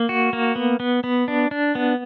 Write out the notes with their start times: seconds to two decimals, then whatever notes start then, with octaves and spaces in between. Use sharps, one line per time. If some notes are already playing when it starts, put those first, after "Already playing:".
Already playing: A#3
0.09 F#4
0.33 A#3
0.56 B3
0.80 B3
1.04 B3
1.28 D4
1.51 D4
1.75 B3